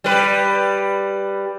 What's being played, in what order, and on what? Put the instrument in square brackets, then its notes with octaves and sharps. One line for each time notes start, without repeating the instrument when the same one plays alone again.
[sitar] G3 B4